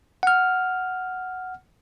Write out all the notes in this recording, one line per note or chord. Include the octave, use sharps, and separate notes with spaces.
F#5 F6